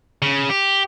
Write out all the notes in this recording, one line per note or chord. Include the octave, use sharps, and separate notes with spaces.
C#3
G4